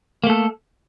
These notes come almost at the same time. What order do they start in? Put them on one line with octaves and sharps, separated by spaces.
A#3 A3 A4